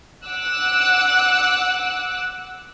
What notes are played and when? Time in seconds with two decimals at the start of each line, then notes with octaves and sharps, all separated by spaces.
0.25 F#5 D6 E6 F#6